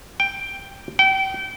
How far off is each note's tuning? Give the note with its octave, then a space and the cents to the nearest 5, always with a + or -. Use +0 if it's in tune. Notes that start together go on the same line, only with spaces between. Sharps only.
G5 +5
G5 -30